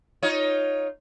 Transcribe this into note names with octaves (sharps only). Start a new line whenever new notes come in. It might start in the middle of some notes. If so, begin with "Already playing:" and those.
D#4 F4 C#5